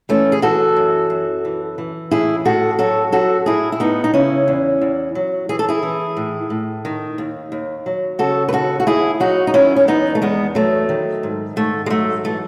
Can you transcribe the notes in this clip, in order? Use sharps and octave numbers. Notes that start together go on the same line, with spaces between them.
E3 A3 C#4
G#4
E3 F#4 A4
F#2
F#2
E3
E3
A2 E4 G#4
A2 F#4 A4
F#3 F#4 A4
F#3 F#4 A4
A2 E4 G#4
E4
A2 B3 D#4
D#4
C#3 C#4 E4
E2
E2
F#3
E3 G#4
A4
E4 G#4
E3
A2
A2
D#3
D#2
D#2
F#3
C#3 F#4 A4
B4
D#2 F#4 A4
F#4
D#2 E4 G#4
F#3 D#4 F#4
D#4
D#3 C#4 E4
C#4
E2 B3 D#4
A3
E2 G#3 B3
F#3 A3
D#3
G#2
G#2 A3
G#3
F#3 A3
E3 A3